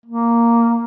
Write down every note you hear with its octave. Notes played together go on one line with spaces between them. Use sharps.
A#3